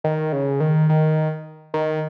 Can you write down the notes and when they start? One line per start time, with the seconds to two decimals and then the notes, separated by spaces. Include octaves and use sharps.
0.04 D#3
0.32 C#3
0.60 D#3
0.89 D#3
1.74 D#3